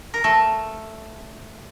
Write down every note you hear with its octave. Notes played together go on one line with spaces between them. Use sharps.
A#4
A3 A4